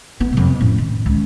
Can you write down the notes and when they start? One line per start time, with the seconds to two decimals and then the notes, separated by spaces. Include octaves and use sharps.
0.20 A3 B3
0.33 F2 C3
0.61 A2 C#4
0.78 D#3
1.06 C#2